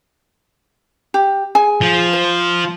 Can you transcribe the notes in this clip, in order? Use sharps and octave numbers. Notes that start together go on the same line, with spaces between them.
G4
G#4 G#5
F3
C5